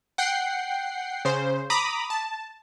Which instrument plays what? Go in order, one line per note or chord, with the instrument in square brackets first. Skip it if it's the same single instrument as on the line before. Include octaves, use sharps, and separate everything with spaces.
[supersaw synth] F#5 G5 C7
C#3 C5
A#5 B5 D6 D#6
A5